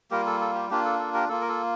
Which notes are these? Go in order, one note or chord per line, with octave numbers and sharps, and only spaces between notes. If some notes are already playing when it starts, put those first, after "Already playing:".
G3 A#3 F4 G4 A#4
A4
A4
G4
A#3 D4 F4 G4
A4
A4
G4 A#4
A#3 F4 A4
A#4
A4